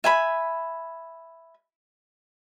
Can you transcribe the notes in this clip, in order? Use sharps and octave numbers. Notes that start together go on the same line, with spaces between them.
E5 G#5 B5